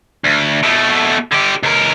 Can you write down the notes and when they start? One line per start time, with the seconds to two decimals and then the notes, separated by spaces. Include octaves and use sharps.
0.24 D2
0.63 B2 A3
1.32 D3 G4
1.63 C#2 A#4